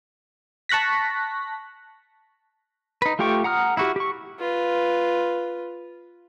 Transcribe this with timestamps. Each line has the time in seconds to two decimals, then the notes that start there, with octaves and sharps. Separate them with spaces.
0.69 A5 C#6 F#6 A#6 B6
3.02 D#4 B4
3.19 A3 F4 G4 G5 C#6
3.44 F#5 A#5 D#6 F6
3.77 E4 F#4 G4
3.96 G4 C#6
4.39 F4 B4